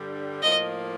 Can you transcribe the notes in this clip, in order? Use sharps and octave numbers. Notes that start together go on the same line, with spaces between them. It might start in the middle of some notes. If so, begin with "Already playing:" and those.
Already playing: G2 D3 G3
A2 F3 A#3 D#5